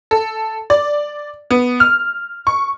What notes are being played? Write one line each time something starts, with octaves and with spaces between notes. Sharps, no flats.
A4
D5
B3
F6
C#6